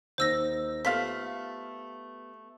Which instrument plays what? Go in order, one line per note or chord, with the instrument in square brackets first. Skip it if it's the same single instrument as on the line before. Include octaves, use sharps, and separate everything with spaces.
[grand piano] D#2 D#4 [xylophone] C5 E6 A#6
[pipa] A3 F4 F5 [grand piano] B3 G4 [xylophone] B6